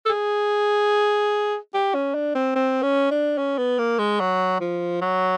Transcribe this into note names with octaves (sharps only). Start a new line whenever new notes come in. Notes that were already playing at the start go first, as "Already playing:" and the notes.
A4
G#4
G4
C#4
D4
C4
C4
C#4
D4
C#4
B3
A#3
G#3
F#3
F3
F#3